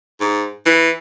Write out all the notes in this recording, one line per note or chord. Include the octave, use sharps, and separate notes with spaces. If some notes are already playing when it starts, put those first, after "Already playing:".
G#2
E3